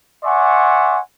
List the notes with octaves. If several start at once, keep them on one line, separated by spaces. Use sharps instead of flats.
D5 E5 F#5 G#5 C6 C#6